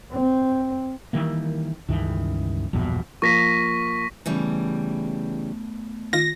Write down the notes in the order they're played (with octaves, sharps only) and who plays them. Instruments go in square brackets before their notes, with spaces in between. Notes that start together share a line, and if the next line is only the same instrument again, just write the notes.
[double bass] C4
[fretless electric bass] D#3 E3 G3 A#3
C#2 G2 D#3 E3
A#1 E2 G2 B2
[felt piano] F3 A#3 [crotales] C#6 A#6 B6
[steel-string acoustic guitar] C#3 E3 G3 [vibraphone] A3 B3
[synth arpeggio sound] D#3 F4 [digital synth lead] A#6